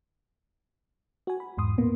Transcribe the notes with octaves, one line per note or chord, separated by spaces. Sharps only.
F#4 G#5
B5
E2 G#2 C6 D#6
A#2 A#3 B3